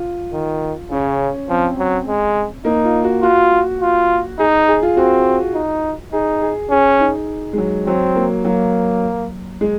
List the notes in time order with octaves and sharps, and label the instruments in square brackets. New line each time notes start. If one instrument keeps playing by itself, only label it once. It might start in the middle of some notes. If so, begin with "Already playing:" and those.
Already playing: [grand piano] F4
[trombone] D#3
[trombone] C#3 [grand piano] C#4
[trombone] F3 [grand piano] C4
[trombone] F#3
G#3
[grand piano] A#3 [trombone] D#4
[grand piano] F4
F#4
[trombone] F4 [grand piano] F#4
[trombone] F4
[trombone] D#4 [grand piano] G#4
[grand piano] G#4
F4
[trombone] C4 [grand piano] F#4
[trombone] D#4
[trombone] D#4 [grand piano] G#4
[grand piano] G#4
[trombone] C#4 [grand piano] G#4
[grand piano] D#4
G#3
F#3
[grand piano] F#3 [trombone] C4
[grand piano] A#3
[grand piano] F#3 [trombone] A#3
[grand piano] G#3